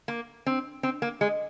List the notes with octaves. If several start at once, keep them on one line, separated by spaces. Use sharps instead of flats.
A#3
C4
C4
A#3
G#3